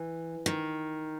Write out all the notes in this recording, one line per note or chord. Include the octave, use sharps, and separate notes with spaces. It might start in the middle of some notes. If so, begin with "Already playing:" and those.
Already playing: E3
D#3